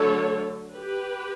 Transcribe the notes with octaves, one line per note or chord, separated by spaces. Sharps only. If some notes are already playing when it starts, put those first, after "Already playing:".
Already playing: D3 F#3 A3 A4 C#5
G4 B4